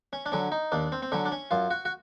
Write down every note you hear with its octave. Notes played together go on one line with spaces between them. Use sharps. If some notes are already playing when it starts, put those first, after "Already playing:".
C#4
D4
D3 F#3 C#4
D#4
D#2 D4
C4
C4
D3 F#3 C#4
D4
C#4
F#2 F4
F#4
F#4